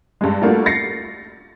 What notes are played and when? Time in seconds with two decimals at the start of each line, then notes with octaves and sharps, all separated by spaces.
0.21 G2 G#3
0.42 G3 A3 A#3 D4 F4 F#4
0.66 A6 A#6 C7 C#7